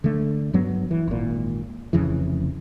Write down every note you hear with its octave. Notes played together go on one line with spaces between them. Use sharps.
D3 A3
G2 F#3 B3
E3
G#1 A#2
F1 F2 C#3 E3